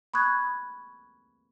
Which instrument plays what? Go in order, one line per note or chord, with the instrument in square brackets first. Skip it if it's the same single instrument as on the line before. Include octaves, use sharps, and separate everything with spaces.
[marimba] B5 C#6 D#6 F#6 G#6